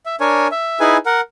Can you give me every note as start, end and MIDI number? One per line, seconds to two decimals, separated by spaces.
0.06 0.16 76
0.20 0.47 62
0.20 0.47 70
0.20 0.47 73
0.20 0.47 80
0.52 0.79 76
0.80 0.97 63
0.80 0.97 64
0.80 0.97 68
0.80 0.97 71
0.80 0.97 80
1.06 1.21 70
1.06 1.21 78